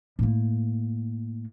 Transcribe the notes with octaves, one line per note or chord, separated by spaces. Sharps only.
A2 A#3